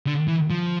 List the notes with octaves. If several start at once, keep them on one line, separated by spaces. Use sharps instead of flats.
D3
E3
F3